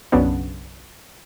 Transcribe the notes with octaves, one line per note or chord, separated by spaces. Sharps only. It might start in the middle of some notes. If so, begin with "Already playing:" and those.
B1 F#2 C#3 F#3 B3 D4